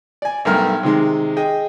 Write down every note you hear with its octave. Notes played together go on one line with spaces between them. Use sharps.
D5 G#5
B1 G2 A3 A#4 G5 F6
C3 D#3 G#3
G#4 D#5 G5